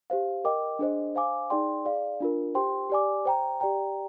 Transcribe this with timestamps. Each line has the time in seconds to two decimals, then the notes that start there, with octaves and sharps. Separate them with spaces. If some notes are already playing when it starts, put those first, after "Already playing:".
0.10 G4 C5 F5
0.44 A#4 D#5 G5 D6
0.79 D4 G#4 C5 D#5
1.15 C5 F5 G#5 D6
1.50 D#4 G#4 D5 G5 C6
1.85 G#4 D5 F5
2.20 D4 F4 A#4
2.55 G4 C5 G5 C6
2.90 G4 D5 G#5 D6
3.25 C5 G5 A#5
3.60 G4 D5 G5 A#5